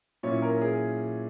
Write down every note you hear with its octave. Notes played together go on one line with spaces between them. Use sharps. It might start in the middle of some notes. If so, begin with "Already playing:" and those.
A#2 F#3 C#4 E4 C#5
A#4
G#4